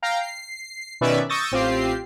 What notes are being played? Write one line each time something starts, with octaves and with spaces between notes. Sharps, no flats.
F5 G5 A#5
C7
B2 D#3 C#4 B4 D5 E5
C#6 D#6 E6 G6 A6 A#6
A1 C4 F4 G4 C7